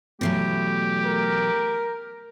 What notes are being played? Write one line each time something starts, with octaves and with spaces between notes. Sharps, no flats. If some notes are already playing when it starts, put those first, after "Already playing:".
B2 E3 F#3 A3 G4
A#4